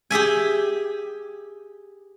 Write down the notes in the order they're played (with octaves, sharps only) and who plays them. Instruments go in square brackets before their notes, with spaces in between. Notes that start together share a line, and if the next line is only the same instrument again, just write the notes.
[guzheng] G4 G#4 E5 G#5